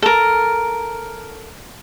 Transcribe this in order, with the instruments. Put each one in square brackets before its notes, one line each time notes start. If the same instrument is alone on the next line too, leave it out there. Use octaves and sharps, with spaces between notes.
[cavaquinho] A4 A#4